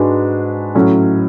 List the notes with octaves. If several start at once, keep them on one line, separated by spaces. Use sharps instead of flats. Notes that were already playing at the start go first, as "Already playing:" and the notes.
Already playing: G#2 G#3 D4 F#4 B4
A2 F#3 C#4